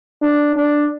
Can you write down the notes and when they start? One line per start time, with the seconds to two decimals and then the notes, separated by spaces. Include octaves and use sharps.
0.22 D4
0.56 D4